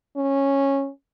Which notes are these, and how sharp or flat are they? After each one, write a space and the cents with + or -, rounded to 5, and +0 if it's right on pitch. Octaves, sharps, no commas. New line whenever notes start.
C#4 -10